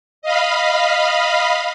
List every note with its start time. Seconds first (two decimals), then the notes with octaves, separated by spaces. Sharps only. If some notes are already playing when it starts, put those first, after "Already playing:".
0.22 D#5 F5 B5